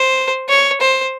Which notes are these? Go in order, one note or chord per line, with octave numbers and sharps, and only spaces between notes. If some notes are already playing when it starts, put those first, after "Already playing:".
Already playing: C5
C#5
C5